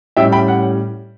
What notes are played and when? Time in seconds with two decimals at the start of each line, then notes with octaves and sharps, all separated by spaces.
0.17 A2 G3 C#4 E5 G5
0.32 G5 B5
0.48 F#5